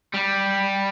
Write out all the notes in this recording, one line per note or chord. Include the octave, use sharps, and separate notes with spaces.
G3